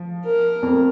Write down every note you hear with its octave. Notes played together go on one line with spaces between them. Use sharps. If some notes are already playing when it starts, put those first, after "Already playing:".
Already playing: F3
A#4
F2